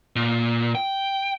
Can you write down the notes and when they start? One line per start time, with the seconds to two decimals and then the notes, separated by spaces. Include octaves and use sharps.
0.16 A#2
0.75 G5